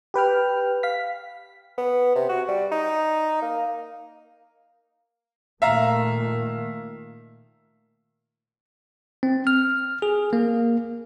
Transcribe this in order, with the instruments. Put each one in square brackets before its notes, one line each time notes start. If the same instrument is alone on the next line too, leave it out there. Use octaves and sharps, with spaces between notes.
[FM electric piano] G4 B4 G5 F6
F5 B6
[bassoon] B3
C3
F#4
G3
D#4
A#3
[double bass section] A#2 D#3 A3 [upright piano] E5 F5 A#5
[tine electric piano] C4
F6
G#4
A#3